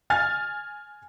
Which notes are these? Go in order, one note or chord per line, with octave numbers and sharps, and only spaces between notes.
G#5 F6 A6